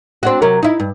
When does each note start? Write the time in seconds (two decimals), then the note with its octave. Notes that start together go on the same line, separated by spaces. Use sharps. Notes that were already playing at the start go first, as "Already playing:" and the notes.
0.23 C4 D4 F#4
0.42 C3 F#3 A#4
0.63 D#4 E4
0.80 G2